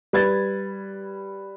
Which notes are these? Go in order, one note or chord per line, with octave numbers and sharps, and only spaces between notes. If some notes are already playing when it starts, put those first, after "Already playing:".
G3 B4 G#6 A6